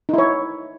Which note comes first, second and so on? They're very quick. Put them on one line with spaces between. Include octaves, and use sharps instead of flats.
D#4 E4 C#5